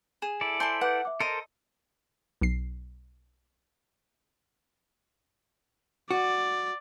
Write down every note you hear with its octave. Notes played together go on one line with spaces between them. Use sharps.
G#4 E7
E4 A4 D5
C5 G#5 A5 C6
B4 F#5 D6 G6
E5 D6
A4 A#4 C5 D#5 C6 A#6
B1 C7
F#4 D5